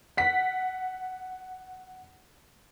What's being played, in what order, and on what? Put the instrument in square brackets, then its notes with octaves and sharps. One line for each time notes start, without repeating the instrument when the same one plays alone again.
[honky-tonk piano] F#5 B6